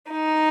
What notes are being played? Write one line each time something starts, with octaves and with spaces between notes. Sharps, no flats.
D#4